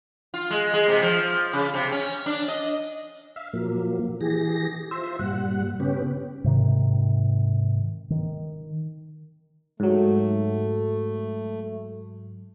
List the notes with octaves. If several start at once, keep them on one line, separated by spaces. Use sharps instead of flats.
F4
G#3
G#3
C3
F3
C#3
C3
C#4
D4
D#5
E5 F5
A#2 F3 F#3 A#3
E3 G4 G#4 A#6
F4 C5 E5
G2 A#2 G3 F#5
C#3 B3 C#4 G4
G#2 C3 D#3
D#3
G#2 F#3 A3